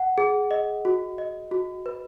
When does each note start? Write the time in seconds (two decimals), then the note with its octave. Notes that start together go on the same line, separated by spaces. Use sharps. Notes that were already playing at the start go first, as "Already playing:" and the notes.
Already playing: F#5
0.18 G#4
0.51 D#5
0.85 F#4
1.18 D#5
1.51 F#4
1.86 B4